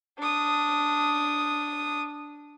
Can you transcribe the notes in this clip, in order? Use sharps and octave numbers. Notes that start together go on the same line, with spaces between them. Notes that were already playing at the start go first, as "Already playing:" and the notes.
D4 D#6